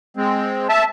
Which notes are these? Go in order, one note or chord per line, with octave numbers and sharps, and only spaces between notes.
G#3 C4
E5 A5